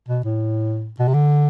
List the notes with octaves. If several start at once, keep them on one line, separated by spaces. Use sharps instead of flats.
B2
A2
B2
C3
D3